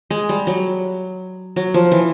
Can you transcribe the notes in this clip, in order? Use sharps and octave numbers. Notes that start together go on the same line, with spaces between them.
G#3
G3
F#3
F#3
F3
E3